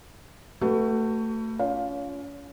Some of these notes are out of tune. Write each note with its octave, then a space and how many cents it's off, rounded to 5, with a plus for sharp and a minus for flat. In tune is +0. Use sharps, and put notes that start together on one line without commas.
A3 +25 F#4 +25 B4 +5
C#4 +35 F4 +0 F5 +10